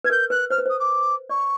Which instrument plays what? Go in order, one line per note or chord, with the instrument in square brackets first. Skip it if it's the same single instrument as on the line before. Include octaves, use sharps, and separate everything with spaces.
[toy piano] B4 [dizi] G#6
[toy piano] A#4 [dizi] G6
[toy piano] B4 [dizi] F#6
[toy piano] C5 [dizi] F6
[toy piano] B4
[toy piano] C5 [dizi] D#6
[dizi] D6
[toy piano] D5 [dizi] C#6